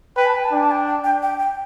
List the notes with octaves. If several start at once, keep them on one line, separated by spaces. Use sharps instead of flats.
B4 G5
A5
G5
A5
D4 G5
A5
G5
G5
G5
G5
G5